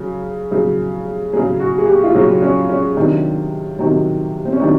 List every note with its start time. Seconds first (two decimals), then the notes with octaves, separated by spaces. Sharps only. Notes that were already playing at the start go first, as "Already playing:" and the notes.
Already playing: C#3 F#3
0.51 C#3 F#3
1.33 C#3 F#3 G#4
1.60 F#4
1.78 G#4
1.87 G4
2.04 F4
2.14 C#3 F#3 F#4
2.42 C#4
2.69 C#4
2.97 C3 D#3 F#3 D4
3.79 C3 D#3 F#3
4.45 C4
4.53 C#4
4.60 C3 D#3 F#3 D4